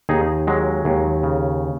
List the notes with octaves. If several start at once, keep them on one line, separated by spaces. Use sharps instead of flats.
D#2 D#4 G#4
F#3 G#3
D#2
C#3